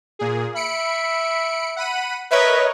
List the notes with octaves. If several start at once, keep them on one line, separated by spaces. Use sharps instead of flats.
A#2 G#4
E5 B5 C#7 D7
F#5 B5 D#7
A#4 B4 C#5 D#5 E5